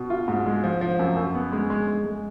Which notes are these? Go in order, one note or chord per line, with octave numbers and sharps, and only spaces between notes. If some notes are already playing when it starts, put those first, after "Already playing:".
Already playing: B2
F4
G#2
G#3
F3
F3
F#2
F#2
B3
G#3
G#3
G#3
G#3